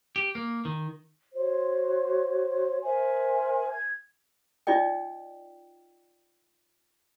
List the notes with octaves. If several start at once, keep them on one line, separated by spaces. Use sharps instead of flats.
G4
A#3
D#3
F#4 C5 C#5
A#4 C5 E5 G#5
G#6
D#4 F4 D5 D#5 G5